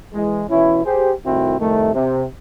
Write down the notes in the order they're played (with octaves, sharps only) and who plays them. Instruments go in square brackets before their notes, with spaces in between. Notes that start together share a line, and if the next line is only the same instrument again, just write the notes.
[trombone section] E3 G#3
B2 E3 C#4 E4
G4 G#4 C5
C2 A2 D#3 C4 E4 F#4
C2 F2 D#3 A3
C3